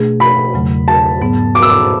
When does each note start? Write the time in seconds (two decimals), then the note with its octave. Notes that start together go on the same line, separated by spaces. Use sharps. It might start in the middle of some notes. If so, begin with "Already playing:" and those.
Already playing: B2 A3 D4 G#4
0.20 B5
0.54 E2 C#3 F#3 A3
0.88 A5
1.21 G#2 F#3 B3
1.55 D6
1.62 E6
1.69 D6